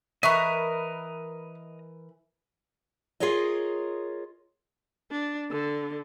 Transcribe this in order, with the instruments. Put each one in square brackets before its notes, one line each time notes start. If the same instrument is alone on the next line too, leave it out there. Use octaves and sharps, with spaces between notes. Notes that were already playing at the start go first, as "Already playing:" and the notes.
[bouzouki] E3 A#4 [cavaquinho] B4 C#6 D#6 [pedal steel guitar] D#5 A#5 [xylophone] E5
[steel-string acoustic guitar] F4 G#4 A#4 C#5 D#5
[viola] D4
D3